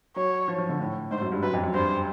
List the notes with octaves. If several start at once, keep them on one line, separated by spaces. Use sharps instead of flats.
F#3 C#5
F3
F3
D3
A2
G#2 C5
F#2
G2
F#2 B4
F2
F#2
G2 C5